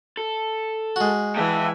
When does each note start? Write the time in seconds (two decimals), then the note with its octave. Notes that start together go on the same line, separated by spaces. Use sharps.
0.17 A4
0.96 G#3 F#4
1.36 E3 E5 G5 A5